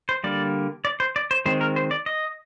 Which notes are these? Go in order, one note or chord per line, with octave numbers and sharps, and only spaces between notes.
C5
D3 G3 A#3 D5
D5
C5
D5
C5
D#3 G#3 C4 C5
A#4
C5
D5
D#5